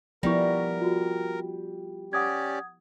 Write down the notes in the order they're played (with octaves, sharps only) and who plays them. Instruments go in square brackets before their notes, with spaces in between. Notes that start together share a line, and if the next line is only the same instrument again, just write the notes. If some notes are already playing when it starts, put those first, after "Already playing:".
[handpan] F3 B3 E4 [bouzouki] G3 [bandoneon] A#4 [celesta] C#6 A#6
[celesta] F4 F#4
[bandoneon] C#4 G4 D5 [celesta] F#5 D#6 G#6